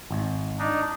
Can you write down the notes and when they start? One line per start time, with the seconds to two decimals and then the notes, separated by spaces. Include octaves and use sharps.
0.11 G#1
0.59 D4 D#4